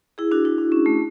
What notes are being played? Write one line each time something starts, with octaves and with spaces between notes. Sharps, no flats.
E4 G#4
D4 F#4
E4
D4
C#4
A3